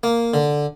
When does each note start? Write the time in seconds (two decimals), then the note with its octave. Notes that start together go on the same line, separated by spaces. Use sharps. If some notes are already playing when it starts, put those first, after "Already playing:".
0.03 A#3
0.34 D3